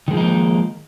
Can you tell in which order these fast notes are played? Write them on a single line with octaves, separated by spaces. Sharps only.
D#3 G#3 F3 D#4 A#3